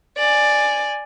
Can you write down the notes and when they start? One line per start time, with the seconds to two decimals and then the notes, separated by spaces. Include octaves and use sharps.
0.17 D5 G#5